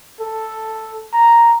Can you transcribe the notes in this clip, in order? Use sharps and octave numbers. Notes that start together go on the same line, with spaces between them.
A4
A#5